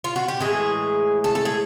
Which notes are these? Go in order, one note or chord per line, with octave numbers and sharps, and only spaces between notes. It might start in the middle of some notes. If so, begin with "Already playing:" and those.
F4
F#4
G4
A2 E3 G#3 G#4
A4
A4
G#4